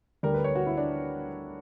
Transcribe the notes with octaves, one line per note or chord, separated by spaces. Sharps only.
D2 D3 G3 A#4
B4
C#5
F#4
E4
D4